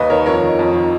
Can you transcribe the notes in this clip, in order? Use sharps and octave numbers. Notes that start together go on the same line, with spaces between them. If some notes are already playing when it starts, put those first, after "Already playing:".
Already playing: D#2 B4 D#5
D#3 A#4 C#5
F2 A#4 C#5
D#3
F2
D#3